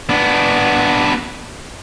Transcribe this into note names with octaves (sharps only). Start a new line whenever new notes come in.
B3 D4